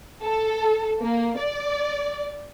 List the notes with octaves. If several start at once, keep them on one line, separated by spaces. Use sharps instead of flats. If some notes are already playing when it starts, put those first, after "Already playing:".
A4
A#3
D5